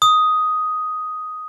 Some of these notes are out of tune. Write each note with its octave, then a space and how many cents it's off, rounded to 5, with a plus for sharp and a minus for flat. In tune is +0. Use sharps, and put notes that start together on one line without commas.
D#6 +5